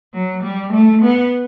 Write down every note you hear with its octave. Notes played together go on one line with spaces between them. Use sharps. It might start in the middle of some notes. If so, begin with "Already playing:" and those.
F#3
G3
A3
B3